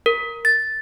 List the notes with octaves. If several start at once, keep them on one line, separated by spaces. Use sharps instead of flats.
A#4
A6